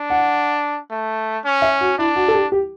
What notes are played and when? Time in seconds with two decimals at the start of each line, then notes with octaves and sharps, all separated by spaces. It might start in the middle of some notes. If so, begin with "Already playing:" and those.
Already playing: D4
0.10 F#5
0.90 A3
1.45 C#4
1.62 E5
1.81 F#4
1.98 D4 E4
2.16 F#4
2.28 A4
2.35 G4
2.52 G4